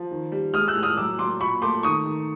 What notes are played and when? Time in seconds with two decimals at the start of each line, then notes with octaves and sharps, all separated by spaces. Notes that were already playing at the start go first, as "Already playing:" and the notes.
Already playing: F3
0.11 D#3
0.32 G3
0.54 G#3 D#6 F6
0.68 E6 F#6
0.76 A2
0.83 D#6 F6
0.97 F#3 D6 E6
1.19 F#3 C6 D6
1.40 A#2 B5 C#6
1.62 A3 C6 D6
1.83 D#3 C#6 D#6
2.06 D#3